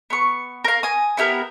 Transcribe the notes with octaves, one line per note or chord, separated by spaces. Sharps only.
B3 C#6
A#4 F5
G#5 D#6
B3 E4 G4 A#4